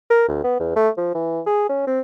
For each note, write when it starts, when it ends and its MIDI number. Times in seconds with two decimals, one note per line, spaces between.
0.10 0.25 70
0.28 0.41 38
0.44 0.58 59
0.60 0.74 40
0.76 0.89 57
0.97 1.14 53
1.15 1.40 52
1.46 1.66 68
1.69 1.85 61
1.87 2.00 60